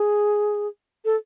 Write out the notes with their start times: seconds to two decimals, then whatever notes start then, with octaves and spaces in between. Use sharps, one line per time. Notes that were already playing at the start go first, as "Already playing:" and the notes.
Already playing: G#4
1.05 A4